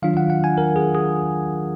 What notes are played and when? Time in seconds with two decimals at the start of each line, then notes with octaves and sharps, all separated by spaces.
0.02 D#3 F#3 D4 F4 F5
0.17 F#5
0.30 F#5
0.44 G#5
0.58 A#4
0.76 G#4
0.94 G#4